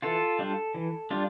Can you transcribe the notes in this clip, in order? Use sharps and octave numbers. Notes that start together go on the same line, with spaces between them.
E3 F4 A4
G3 D4 F4
E3
G3 D4 F4